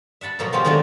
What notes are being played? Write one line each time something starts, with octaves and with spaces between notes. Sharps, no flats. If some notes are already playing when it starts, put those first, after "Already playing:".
E5 F#5 A5 B5
B2 F3 F#3 A#3 B3
F3 G#3 B3 C4 F4 G4
D#3 F3 F#3 A3 D4